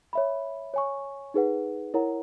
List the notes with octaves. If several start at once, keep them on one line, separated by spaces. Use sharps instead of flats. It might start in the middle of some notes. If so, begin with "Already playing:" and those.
C#5 E5 B5
C#5 G#5 C#6
D#4 G#4 B4 F#5
E4 A#4 C#5 F#5 A#5